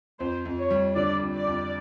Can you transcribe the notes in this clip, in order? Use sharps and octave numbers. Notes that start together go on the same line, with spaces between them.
F2 C5
F2
C#5
G3
D3 D5
F2
D5
F2